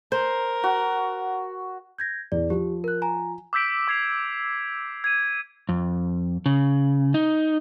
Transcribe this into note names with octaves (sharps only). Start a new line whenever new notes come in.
A#4 C5
F#4
G6 G#6 A#6
E2 D5
F3 G4
A#4 F#6
G#5 A#5
D6 E6 G6 B6 D7
D6 G#6 C7 F7
G#6 D#7
F2
C#3
D#4